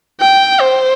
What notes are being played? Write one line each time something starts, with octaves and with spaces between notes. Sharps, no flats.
G5
C5